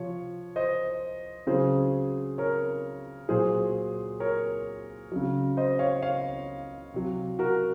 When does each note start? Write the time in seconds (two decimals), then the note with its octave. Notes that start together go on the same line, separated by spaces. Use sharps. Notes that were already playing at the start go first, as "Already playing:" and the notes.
Already playing: C3 F3 C#5
0.56 C5 D#5
1.47 C#3 F#3 G#4 C5
2.38 A#4 C#5
3.29 A#2 F#3 G#4 C5
4.20 A#4 C#5
5.12 C#3 F#3
5.57 C5 D#5
5.79 C#5 F5
6.03 C#5 F5
6.94 C3 F#3
7.39 F#4 A#4